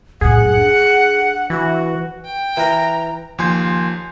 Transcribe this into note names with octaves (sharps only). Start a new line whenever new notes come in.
F#2 A2 G#4 F#5
D4
E3 F#4
G5
E3 A#5
D#2 F3 G#5 C6 G6 C7